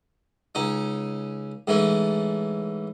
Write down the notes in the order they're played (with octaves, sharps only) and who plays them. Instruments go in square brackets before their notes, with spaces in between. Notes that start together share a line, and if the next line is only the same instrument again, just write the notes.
[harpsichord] C#2 C#4 D#4
G#2 E3 A3 C#4